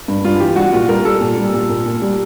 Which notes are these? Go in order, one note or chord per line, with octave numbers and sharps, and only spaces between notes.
G2
G2 F4
E3 G4
G3 F#4
A#2 F4
G3 A#4
G3 A4
A#2
G3
A#2
A#2
A#2
G3